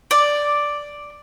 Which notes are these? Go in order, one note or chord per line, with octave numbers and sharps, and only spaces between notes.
D5